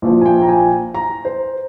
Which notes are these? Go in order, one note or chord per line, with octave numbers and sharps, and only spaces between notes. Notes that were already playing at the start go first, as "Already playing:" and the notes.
A#1 A#2 F3
G#5
G5
A#5
G#5
A#5
C5